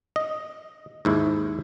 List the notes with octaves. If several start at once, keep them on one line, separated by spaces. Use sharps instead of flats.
D#5
D#2 G#2 E4